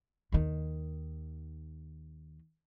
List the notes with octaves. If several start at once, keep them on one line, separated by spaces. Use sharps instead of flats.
D#2 D#3